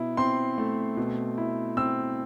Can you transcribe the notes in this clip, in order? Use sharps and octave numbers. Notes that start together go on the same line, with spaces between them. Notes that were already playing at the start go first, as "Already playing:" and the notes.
Already playing: B2 E4
C4 C6
A3
B2
E4
C4 E6